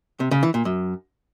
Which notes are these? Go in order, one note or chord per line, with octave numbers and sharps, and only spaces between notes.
C3
C#3
E3
A#2
F#2